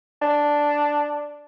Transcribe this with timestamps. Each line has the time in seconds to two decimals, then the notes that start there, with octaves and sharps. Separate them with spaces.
0.22 D4